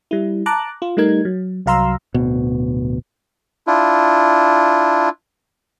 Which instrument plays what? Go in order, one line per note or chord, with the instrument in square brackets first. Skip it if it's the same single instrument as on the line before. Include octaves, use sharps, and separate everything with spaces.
[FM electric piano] G3 E4
A5 A#5 D6 F#6
F4
G3 A3 D#4 A#4 G#6
F#3
C2 F#3 F5 A#5 C6 E6
[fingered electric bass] D1 B2
[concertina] D4 E4 F4